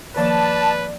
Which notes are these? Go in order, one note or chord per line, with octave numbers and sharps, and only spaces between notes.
D#3 F3 A#3 B4 D5 A5